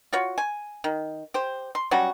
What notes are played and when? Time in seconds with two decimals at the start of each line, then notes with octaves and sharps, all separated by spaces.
0.13 F4 F#4 C#5
0.38 G#5
0.84 D#3
1.34 G4 C5
1.75 C6
1.91 F#3 G3 C#4 F#4